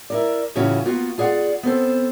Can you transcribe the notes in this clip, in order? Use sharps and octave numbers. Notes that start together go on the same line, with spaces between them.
E4 A#4 D5
A2 C#3 E3 C#4 F4 F#4
A#3 B3 F4 F#4
F4 G#4 D5 F#5
B3 C4 A4 C5